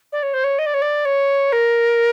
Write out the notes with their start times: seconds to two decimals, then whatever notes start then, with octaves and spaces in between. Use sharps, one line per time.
0.12 D5
0.22 C#5
0.33 C5
0.44 C#5
0.58 D#5
0.66 D5
0.74 C#5
0.81 D5
1.05 C#5
1.52 A#4